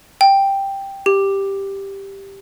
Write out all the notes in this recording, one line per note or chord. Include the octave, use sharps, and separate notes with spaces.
G5
G4